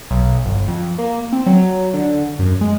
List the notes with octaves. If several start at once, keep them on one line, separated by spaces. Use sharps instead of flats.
B1
G1
F2
A#3
C4
F#3
D3
F#2
G#3